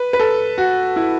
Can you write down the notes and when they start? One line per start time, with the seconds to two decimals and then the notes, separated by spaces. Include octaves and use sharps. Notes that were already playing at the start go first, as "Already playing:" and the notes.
Already playing: B4
0.13 B4
0.19 A4
0.58 F#4
0.96 E4